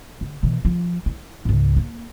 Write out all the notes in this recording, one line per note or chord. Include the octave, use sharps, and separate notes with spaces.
D3
B2 E3
F3
E4
C#2 G#2
A#3